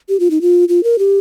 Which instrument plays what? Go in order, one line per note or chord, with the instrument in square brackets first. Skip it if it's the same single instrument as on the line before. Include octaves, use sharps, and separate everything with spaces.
[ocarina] G4
F4
D#4
F4
F4
A#4
G4